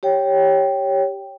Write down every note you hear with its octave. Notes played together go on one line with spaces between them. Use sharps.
G4 C#5 G5